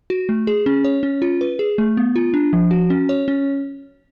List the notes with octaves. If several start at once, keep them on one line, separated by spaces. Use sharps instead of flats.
F#4
A3
G#4
C#4
C#5
C#4
F4
B4
G#4
A3
B3
F4
D4
F3
F#4
C#4
C#5
C#4